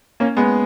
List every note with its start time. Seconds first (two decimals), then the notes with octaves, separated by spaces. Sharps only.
0.20 A#3 C#4
0.37 G#3 B3